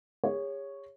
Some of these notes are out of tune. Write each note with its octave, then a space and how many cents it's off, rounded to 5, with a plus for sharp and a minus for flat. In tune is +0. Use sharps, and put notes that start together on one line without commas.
G#4 -45 C#5 +0